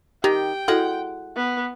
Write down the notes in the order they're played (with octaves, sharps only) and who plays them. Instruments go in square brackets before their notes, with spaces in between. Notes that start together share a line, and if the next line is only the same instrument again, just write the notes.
[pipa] D#3 [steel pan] G4 [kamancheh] G5
[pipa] G#3 F#5 [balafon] E4 F#4 A4
[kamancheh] B3